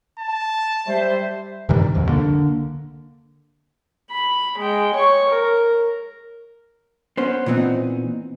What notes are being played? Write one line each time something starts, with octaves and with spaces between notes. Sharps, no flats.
A5
G3 C5 E5
G2 C3 D#3 G3
D#1 C2 F2
D3 A#3
B5
G#3 G5
C#5 C#6
A#4
B3 C#4 C5
A#2 E3 B3 C4 D#4